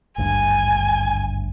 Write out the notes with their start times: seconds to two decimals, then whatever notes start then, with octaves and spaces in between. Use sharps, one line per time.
0.18 G#1 D2 G2 G#5